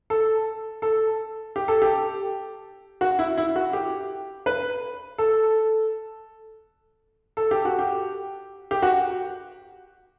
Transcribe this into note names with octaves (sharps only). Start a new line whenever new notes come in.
A4
A4
G4
A4
G4
F#4
E4
E4
F#4
G4
B4
A4
A4
G4
F#4
G4
G4
F#4